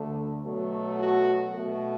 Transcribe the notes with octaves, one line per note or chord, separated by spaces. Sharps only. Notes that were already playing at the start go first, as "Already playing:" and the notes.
Already playing: D2 D3 A3
B2 F#3 A3
F#4
B2 A3